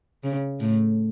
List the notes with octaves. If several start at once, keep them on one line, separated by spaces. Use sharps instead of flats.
C#3
A2 A3